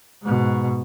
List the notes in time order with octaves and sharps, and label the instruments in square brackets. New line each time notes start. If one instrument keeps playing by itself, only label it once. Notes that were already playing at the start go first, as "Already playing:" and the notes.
[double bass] G#2 B2